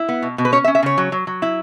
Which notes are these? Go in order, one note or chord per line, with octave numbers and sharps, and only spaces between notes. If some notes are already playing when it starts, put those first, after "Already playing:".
Already playing: E4
B3
B2
B2
B4
C#4 C#5
E5
C#4
E5
C#3 C#5
F#3
F#3
F#3
E4